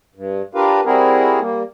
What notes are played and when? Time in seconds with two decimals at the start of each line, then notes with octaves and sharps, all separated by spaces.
0.15 G2
0.55 D4 F4 G4 A#4 B4 F5
0.85 G3 C4 E4 F#4 G#4 A#4
1.40 G3 A#3